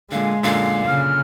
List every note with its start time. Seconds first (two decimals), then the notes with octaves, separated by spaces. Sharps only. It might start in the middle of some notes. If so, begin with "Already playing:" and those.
0.12 A#2 D3 G#3 F5
0.43 F#2 A#2 D3 F5
0.87 C#3 F6